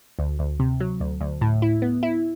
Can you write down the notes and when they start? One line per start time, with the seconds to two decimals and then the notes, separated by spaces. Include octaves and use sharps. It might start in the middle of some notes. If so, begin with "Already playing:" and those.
0.19 D2
0.39 D2
0.60 C3
0.80 F#3
1.00 D2
1.21 D2
1.41 A2
1.62 E4
1.82 B3
2.03 E4